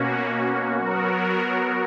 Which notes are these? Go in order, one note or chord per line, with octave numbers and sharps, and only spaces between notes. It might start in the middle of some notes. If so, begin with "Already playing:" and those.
Already playing: B2 A#3 C#4 F#4
F#3 B3 F#4 A#4